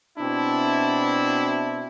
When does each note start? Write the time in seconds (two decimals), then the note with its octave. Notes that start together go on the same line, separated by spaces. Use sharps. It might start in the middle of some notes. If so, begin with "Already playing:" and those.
0.19 B2 C4 D4 E4